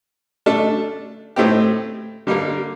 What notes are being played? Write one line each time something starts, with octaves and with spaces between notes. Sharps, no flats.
A3 D4 A4
A2 A3 C4 G4
D3 G3 A#3